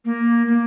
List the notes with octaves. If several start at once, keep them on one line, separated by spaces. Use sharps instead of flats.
A#3
A#3